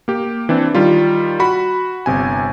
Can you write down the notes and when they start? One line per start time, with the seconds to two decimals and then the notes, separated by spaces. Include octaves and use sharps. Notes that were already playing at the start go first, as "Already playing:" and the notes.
0.08 A#3 G4
0.49 E3 C4 D4
0.75 D#3 G3 F4
1.40 F#4 B5
2.06 G1 C3 G#5